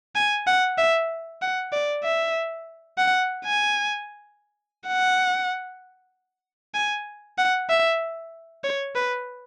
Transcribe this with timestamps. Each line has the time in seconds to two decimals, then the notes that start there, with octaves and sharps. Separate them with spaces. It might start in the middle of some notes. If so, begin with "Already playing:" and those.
0.15 G#5
0.47 F#5
0.78 E5
1.42 F#5
1.73 D5
2.04 E5
2.98 F#5
3.45 G#5
4.87 F#5
6.75 G#5
7.38 F#5
7.70 E5
8.64 C#5
8.95 B4